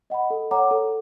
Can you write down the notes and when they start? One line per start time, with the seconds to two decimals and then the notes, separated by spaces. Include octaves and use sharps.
0.10 D#5 F#5 B5
0.30 A4
0.51 C#5 F#5 A#5 D6
0.71 A4